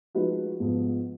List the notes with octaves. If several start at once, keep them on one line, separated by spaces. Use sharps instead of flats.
F3 G#3 D#4 F#4 B4
G#2 F3 B3